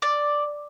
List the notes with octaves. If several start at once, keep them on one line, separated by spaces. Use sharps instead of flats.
D5